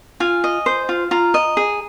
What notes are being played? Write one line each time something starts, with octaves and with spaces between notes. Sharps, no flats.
F4 G#5
D#5
C5
F4
F4 A#5
D#5
G#4